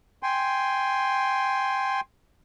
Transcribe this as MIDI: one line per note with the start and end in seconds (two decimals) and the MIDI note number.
0.23 2.01 79
0.23 2.01 80
0.23 2.01 84